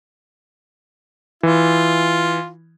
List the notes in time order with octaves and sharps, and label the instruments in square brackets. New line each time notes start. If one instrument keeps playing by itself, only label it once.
[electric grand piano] E3 [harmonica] F4